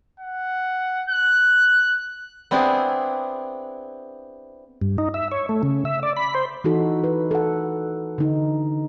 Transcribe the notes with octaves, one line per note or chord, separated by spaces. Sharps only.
F#5
F#6
B3 C4 D4 E4 G#4
G2
D#4
E5
C#5
A3
C#3
E5
D5
B5
C5
E3 D#4 F#4 A4
B4
A4 F#5
D3 D#4